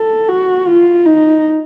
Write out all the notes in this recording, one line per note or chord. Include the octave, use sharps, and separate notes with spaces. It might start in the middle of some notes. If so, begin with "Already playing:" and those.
Already playing: A4
F#4
F4
D#4